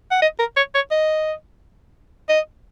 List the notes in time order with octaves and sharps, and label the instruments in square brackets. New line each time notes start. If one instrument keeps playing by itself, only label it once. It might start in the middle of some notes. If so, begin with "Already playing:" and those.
[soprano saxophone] F#5
D#5
A#4
C#5
C#5
D#5
D#5